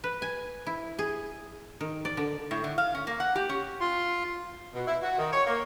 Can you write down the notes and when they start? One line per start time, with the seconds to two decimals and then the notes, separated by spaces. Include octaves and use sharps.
0.04 B4
0.22 G#5
0.67 E4
0.99 G#4
1.81 D#3
2.05 D5
2.17 D3
2.51 A2
2.64 D3
2.78 F5
2.95 C#4
3.07 A#3
3.20 F#5
3.35 G4
3.49 C#4
3.81 F4 C6
4.75 B2
4.87 E4
5.02 F#4
5.17 D#3
5.33 C#5
5.47 A#3